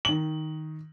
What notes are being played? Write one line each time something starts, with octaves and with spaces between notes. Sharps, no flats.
D#3 F#7